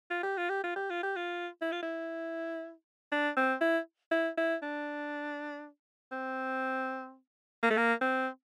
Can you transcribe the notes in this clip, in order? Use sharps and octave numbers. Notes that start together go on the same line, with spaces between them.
F4
G4
F4
G4
F4
G4
F4
G4
F4
E4
F4
E4
D4
C4
E4
E4
E4
D4
C4
A#3
A3
A#3
C4